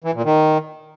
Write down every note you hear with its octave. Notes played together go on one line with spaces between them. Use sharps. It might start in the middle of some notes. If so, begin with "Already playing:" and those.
E3
A#2
D#3